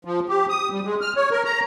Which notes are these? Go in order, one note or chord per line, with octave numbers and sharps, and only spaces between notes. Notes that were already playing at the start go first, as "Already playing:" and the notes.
F3
G4
D#6
G3
G#3
F6
C#5
A#4
A#5